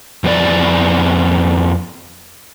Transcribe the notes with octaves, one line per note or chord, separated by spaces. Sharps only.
F2 B3 D5